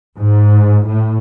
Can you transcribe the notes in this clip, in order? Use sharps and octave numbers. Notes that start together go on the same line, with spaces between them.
G#2
A2